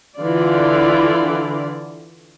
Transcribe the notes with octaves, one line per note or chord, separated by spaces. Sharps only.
D3 E3 F4 D5